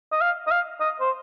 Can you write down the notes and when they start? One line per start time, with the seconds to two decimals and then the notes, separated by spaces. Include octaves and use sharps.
0.12 D#5
0.21 F5
0.47 D#5
0.51 F5
0.80 D#5
1.00 C5